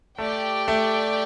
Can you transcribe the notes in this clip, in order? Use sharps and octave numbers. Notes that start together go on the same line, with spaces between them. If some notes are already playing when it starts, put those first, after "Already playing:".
A3 G4 D5 G5
A3